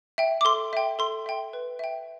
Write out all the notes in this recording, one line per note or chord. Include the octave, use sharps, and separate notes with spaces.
E5 G5
D6
A4 C6
E5 G5
A4 C6
E5 G5
B4
E5 G5